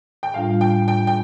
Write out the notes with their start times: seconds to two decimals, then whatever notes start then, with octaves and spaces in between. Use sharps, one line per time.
0.23 G5
0.34 A2 G3 D4 F4 F5
0.61 G5
0.88 G5
1.07 G5